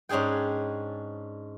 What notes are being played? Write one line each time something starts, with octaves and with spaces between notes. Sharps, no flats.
G#2 C#4 D4 G#4 G5